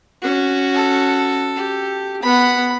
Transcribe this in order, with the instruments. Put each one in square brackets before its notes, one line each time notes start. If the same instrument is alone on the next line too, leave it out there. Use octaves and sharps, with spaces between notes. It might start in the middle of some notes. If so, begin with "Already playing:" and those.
[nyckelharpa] C#4 F#4
[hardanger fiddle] A4
[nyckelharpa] G4
[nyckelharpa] B3 F#5 [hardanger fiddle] B5